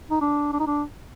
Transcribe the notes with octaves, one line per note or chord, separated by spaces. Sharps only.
D#4
D4
D4
D#4
D4